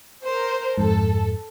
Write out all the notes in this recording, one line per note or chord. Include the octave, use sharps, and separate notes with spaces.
A#4 C5
F2 G#2 A4